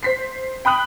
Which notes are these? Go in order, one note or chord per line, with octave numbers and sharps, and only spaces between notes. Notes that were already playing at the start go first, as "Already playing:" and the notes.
C5 B6 C7
G5 B5 D#6 F#6 F#7